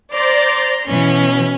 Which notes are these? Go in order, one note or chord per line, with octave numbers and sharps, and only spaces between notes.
C5 D5 A#5 C6 F6
B2 E3 C#4